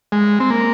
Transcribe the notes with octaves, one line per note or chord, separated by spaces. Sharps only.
G#3
C4
A#3